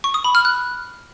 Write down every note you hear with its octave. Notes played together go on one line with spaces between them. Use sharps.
C#6
D#6
B5
F6
F#6